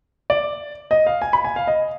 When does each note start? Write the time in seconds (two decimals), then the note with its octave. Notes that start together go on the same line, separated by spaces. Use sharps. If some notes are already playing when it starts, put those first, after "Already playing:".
0.30 D5
0.91 D#5
1.06 F5
1.22 G#5
1.33 B5
1.44 G#5
1.56 F5
1.67 D#5